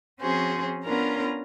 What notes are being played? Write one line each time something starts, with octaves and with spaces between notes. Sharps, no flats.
F3 C4 C#4 F#4 G#4 C5
B3 C#4 D4 F4 A#4 A#5